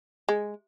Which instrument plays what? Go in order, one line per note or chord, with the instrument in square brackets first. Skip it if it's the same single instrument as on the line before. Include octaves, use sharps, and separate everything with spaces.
[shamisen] G#3